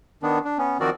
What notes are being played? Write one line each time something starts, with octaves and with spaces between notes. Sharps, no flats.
D#3 B3 D4
D4
B3 C#4
D#3 F3 C4 F#4 A#4 D5